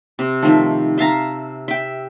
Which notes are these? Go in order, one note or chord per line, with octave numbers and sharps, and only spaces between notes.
C3
D#3 F3 A3
E5 F5 A5 A#5
E5 G5